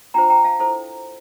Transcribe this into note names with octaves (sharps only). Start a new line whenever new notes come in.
D4 F4 C5 G5 A#5
G5 A#5
F5 A5
E4 A4 C5